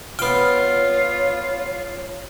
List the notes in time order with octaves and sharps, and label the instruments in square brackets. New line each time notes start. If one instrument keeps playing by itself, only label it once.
[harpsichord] B3 G5 [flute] F4 [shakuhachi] C#5 [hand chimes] F6